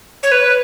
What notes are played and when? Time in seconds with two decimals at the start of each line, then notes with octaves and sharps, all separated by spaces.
0.23 C#5
0.32 B4